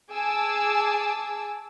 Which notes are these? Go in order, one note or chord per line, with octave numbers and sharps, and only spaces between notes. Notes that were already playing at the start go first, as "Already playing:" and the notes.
G#4 G#5 A5 D6 E6